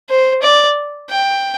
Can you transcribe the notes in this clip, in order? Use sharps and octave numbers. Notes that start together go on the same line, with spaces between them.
C5
D5
G5